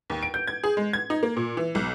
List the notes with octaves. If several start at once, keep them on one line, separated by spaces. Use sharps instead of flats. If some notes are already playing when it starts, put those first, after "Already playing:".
D#2
D7
G6
G#6
G#4
G#3
G#6
D#4
A#3
A#2
E3
B1